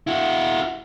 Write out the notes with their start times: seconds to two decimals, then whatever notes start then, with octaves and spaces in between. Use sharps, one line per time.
0.07 E4 F#4